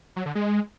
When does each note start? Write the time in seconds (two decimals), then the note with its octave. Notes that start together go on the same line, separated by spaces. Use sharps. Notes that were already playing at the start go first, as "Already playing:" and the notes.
0.16 F#3
0.26 D3
0.35 G#3